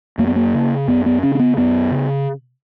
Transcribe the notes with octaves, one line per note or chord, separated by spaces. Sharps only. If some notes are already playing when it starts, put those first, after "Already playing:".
F#2 A#3
B3
A#3
C#3
F#2 B3
B3
C#3 C#4
C#4
B3
F#2 B3
C#3